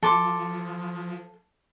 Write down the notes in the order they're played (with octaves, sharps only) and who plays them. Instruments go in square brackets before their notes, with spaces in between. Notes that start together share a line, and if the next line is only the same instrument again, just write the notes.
[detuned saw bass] F3 [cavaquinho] A4 C6 D6